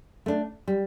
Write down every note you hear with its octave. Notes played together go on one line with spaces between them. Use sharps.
A3 D4
G3